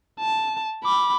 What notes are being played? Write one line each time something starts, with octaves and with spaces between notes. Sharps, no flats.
A5
B5 D6